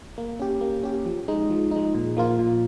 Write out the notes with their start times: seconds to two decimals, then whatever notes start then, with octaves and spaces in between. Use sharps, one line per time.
0.18 A#3
0.39 C#4 G4
0.61 A#3
0.83 C#4 G4
1.05 F3
1.28 G#3 D#4
1.50 F3
1.71 G#3 D#4
1.95 A#2
2.17 F3 A#3 F4
2.39 A#2